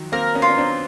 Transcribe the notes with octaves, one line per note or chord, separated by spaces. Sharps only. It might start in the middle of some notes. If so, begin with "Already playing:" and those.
Already playing: D#3 F3 F#3
A#3 C4 A#4
B3 C#4
F4
C#4
C4 D4